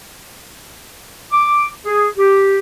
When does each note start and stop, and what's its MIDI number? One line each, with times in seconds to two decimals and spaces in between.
1.32 1.65 86
1.85 2.07 68
2.17 2.59 67